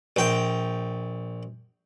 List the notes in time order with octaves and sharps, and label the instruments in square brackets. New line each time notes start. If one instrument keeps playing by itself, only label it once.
[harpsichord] A#1 G5